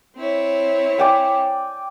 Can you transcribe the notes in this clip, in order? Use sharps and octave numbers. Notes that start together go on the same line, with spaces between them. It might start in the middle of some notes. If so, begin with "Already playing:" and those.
C4 E4 C#5
D5 G5 G#5